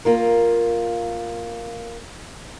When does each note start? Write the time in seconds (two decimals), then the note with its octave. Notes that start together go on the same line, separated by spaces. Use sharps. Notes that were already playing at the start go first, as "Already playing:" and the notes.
0.05 A#3 F4 A#4